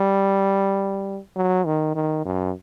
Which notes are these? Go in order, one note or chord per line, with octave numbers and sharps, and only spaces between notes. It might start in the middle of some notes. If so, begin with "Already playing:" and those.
Already playing: G3
F#3
D#3
D#3
F#2